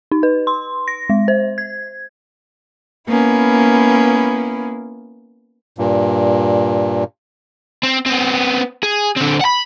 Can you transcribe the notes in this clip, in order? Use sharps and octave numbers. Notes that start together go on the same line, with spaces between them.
D#4
B4
C6
A#6
G#3
C5
G#6
A#3 B3 C#4 E4
G2 A#2
C4
B3 C4
G#4
D3 C4
F#5 B5